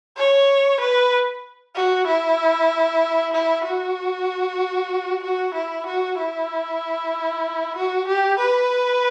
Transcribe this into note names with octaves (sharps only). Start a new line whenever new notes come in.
C#5
B4
F#4
E4
E4
F#4
F#4
E4
F#4
E4
F#4
G4
B4